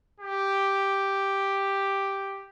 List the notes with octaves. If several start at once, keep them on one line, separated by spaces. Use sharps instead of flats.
G4